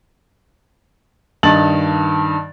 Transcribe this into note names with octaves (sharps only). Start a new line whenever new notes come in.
G2 D#3 D#4 A5 A6 F#7